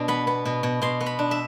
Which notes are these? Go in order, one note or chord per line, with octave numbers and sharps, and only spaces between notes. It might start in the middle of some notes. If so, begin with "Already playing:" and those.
Already playing: B2 D4
B3 B5
B3
B2
B2
B2 C6
B3
B5
D4
E5